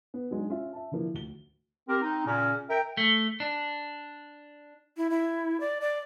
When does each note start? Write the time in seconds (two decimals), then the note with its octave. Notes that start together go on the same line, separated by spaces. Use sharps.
0.14 B3
0.31 F#3 G#3 D4 D#4
0.49 C#4 F4 E5
0.73 E5 A5
0.92 D3 E3 F3 A#3 E4
1.14 D2 G7
1.89 C4 G4 A#4
2.02 C4 D#4
2.26 A#2 C#3 C#4
2.70 A#4 E5 G5
2.97 A3
3.40 D4
4.97 E4
5.10 E4
5.60 D5
5.81 D5